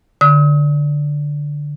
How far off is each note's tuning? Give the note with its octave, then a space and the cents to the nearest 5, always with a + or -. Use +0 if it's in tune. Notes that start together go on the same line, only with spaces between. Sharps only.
D3 +0 D#6 +45